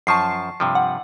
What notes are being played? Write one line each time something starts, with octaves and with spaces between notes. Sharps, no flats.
F#2 F3 A5 C#6 C7
G2 C3 F3
F#5